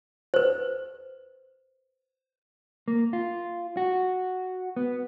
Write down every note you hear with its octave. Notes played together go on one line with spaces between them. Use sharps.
B4 C5
A#3
F4
F#4
B3